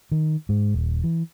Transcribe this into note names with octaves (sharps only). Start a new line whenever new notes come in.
D#3
G#2
D#1
E3